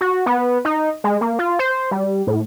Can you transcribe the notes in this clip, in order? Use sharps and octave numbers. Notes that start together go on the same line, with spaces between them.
F#4
B3
D#4
G#3
A#3
F4
C5
G3
A2